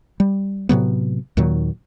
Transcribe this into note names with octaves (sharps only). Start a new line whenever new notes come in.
G3
A2 C3 F#3 B3
D#2 A#2 D#3 F#3